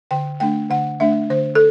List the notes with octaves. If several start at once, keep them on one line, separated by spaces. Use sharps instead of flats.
D3 G5
A3 D4 G5
D3 F#5
A3 D4 E5
D3 C5
A4